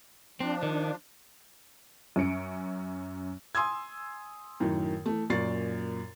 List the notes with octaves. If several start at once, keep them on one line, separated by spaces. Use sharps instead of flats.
F3 C4 D4
D#3
F#2 C#4 C#7 D7
G#5 C6 D#6 E6 G#6
F#2 A2 D#3
E3 A3
F#2 A#2 D5 C#6 A6 C7